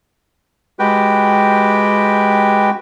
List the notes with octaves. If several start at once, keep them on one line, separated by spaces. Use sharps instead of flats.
G#3 F#4 G4 B4 G5